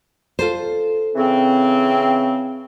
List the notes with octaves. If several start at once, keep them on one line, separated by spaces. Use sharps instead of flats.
F4 A4 C5
C#3 E3 C4